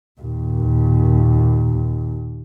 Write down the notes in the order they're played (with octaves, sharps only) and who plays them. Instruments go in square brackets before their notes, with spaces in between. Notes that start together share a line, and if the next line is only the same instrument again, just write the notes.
[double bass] D#2 A#2